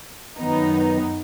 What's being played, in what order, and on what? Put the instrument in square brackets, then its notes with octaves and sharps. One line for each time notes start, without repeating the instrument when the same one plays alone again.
[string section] F#2 D#3 F#3 B3 D#4